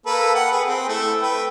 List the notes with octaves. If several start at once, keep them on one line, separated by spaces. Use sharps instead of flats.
A#3 A4 B4
F#5 G5
G#4 B4
C4
A3 E4
B4 G5